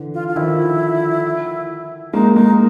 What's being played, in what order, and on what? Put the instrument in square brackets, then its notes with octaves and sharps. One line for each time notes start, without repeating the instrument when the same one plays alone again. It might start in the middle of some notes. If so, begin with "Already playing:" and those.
Already playing: [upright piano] D3 E3
[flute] F4
F4
[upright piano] D#3 F3 [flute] E4
[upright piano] G#3 A#3 [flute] D#4
[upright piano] G#3 A#3 [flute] D#4